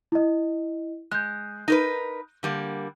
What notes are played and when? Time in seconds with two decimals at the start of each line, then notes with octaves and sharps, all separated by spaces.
0.12 E4 D#5
1.11 G#3 F#6 G6
1.68 D#4 A#4 B4
2.43 D3 G3 A#3